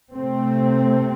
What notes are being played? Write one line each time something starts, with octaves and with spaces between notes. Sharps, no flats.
C3 A3 C4